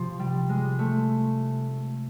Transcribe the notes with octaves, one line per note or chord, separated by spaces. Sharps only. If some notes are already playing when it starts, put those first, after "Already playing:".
Already playing: C3 F3
G3
G#3
A3